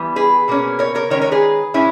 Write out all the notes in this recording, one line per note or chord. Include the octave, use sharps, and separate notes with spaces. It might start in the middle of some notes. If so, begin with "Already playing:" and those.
Already playing: E3 G3 B3
G#4 B4
B2 A#3 C#4
A#4 C#5
A#4 C#5
D#3 G#3 C#4 A#4 C#5
A#4 C#5
G#4 B4
A#2 G#3 C#4 E4